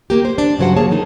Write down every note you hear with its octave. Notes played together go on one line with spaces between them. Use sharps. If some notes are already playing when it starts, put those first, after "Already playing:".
A#3 G4
C5
D4
G2 C#3 F#3 C5 F#5
A#3 G#4 C#5 A5
D#3 D#4 G#4